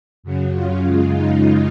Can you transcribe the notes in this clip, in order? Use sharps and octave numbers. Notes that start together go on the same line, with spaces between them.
F#2 C#3 F#3
F4
F#2 C#3 G#3
D#4